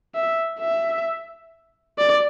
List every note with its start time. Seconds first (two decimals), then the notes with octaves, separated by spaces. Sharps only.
0.15 E5
0.60 E5
1.98 D5